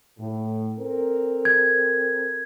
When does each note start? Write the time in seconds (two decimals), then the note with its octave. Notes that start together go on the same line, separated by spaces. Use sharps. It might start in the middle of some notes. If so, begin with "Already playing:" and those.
0.18 A2
0.79 C4 A4 A#4
1.45 G#6